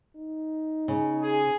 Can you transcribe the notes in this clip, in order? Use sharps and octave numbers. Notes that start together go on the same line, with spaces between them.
D#4
C#3
G#4